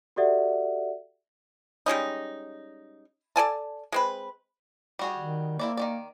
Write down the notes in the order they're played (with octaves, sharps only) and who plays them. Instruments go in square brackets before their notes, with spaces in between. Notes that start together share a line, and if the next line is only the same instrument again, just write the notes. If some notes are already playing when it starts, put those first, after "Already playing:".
[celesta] F#4 G4 A4 D5 E5 F#5
[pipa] G3 G#3 C#4 D#4
A4 D5 G#5 A5
G#3 C4 B4
[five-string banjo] G3 F#4 G#4
[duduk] D#3
[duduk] A#3 [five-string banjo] C4 E4 D5
[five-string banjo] D#3 E3 D5